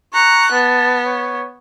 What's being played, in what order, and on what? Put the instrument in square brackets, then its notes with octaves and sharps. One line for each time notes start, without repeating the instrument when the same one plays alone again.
[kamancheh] A#5 F#6 [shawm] C#6
[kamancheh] B3 [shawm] A5
[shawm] C#5